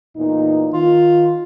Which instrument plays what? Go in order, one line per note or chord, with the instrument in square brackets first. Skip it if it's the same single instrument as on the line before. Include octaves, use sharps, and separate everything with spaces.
[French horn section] E2 A#2 D#4
[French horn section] D#3 [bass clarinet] F4